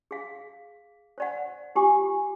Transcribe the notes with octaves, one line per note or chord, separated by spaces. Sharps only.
G#4 F5
C5 D5 F#5
F4 G4 G#5 D6